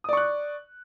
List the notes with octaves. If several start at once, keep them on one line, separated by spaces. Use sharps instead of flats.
D5 C#6 D#6 F#6